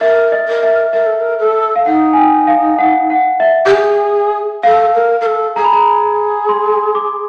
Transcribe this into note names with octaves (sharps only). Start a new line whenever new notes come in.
A#4 E5
D#5
A#4
E5
A#4 E5
A4
A#4
A4
F5
D#4 F#5
G#5
G5
F5
F#5
F#5
E5
G4
G#4
A4 F5
A#4
A#4
A4
G#4 A#5
B5
A#5
C6
D6